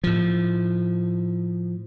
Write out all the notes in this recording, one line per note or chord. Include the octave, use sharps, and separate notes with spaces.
A2 F3